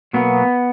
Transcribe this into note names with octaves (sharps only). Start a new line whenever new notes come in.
B2 F#3 A#3 B3